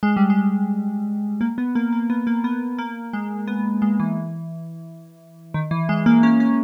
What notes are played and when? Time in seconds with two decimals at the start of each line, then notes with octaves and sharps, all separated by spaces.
0.03 G#3
0.17 G3
0.30 G#3
1.41 A#3
1.58 B3
1.75 A#3
1.93 A#3
2.10 B3
2.27 A#3
2.44 B3
2.78 A#3
3.13 G#3
3.48 B3
3.82 G#3
4.00 E3
5.54 D#3
5.71 E3
5.89 G#3
6.06 A#3
6.23 C#4
6.40 C#4